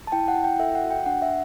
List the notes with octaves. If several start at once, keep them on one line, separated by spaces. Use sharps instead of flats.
A5
E4 G5
F#5
E4
G5
A4 E5
F#5
F#4
G5
D4 F#5
E5